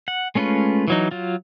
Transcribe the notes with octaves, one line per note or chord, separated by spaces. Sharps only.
F#5
G#3 A3 C#4 F4 B4
E3 F#3 D#4
F#3 F4